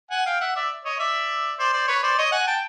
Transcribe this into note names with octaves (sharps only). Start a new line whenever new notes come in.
F#5 G#5
F5 G5
E5 F#5
D5 E5
C#5 D#5
D5 E5
C5 D5
C5 D5
B4 C#5
C5 D5
C#5 D#5
F#5 G#5
G5 A5